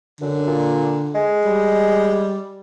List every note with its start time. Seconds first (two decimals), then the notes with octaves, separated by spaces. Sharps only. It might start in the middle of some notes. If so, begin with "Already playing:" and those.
0.21 F#2 D3
0.47 A#2
1.15 G#3
1.44 G3